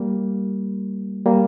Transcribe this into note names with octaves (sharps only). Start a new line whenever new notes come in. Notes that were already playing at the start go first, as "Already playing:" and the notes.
Already playing: G3 A#3
G3 A#3